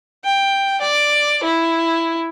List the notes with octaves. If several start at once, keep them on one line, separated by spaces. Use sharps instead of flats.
G5
D5
E4